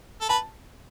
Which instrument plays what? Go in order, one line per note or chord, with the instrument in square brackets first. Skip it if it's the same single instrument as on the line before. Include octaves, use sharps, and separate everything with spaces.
[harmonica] A4
[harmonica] B4 [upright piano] A5